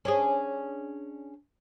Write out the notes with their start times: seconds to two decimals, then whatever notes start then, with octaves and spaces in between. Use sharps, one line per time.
0.05 C#4 D4 G#4